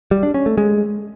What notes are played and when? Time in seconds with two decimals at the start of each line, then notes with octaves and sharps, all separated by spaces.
0.11 G3
0.23 D4
0.34 C#4
0.46 A3
0.58 G#3